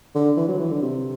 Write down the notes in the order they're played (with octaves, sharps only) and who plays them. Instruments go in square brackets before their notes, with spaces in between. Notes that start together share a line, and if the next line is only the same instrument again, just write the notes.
[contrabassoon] D3
E3
F#3
E3
D3
C3